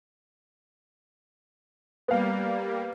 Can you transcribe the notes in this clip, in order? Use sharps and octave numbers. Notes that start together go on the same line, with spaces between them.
G3 A#3 B3 F5